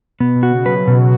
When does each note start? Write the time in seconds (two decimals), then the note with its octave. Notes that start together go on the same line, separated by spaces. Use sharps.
0.20 B2 B3
0.36 B2
0.43 F#4
0.51 C#3
0.65 F#3 B4
0.80 F#3
0.88 B2
0.96 F#4